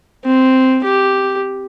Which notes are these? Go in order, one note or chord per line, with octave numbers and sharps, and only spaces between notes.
C4
G4